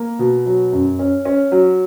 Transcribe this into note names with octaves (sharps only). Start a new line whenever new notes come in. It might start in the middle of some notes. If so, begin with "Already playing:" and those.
Already playing: A#3
B2
F#3
F#2
C#4
C#4
F#3